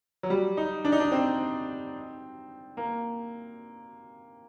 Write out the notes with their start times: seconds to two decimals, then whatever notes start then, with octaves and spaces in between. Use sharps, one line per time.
0.23 F#3
0.30 G3
0.57 D#4
0.85 D4
0.92 D#4
1.00 D4
1.12 C4
2.77 A#3